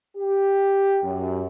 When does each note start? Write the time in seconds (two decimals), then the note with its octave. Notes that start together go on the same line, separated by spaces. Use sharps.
0.17 G4
1.03 F#2